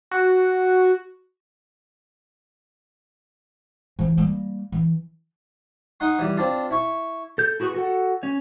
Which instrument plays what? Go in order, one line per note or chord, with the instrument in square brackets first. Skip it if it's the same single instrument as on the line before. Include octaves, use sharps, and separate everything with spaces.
[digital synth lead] F#4
[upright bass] E3 F3
G3 A#3
E3
[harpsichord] D#4 F#5 C6
E3 G3
C4 D4 F4
E4 C#6
[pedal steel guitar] A4 G6
E4 F#4 G#4 B4 C#6
F#4 A4 F#5
C#4 C#5